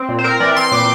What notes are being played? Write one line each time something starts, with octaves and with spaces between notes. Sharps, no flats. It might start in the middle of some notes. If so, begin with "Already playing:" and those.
Already playing: C4
A#2
C5
C4 A#4
E3 D5
C4 C6
A#2 D6